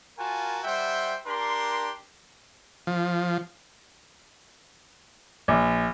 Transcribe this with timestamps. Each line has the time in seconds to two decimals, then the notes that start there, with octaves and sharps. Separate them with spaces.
0.18 F4 F#4 A#4 G#5 A5
0.64 G3 C5 E5 F#5 G5
1.27 D4 G4 A#4 C6
2.87 F3
5.48 A#1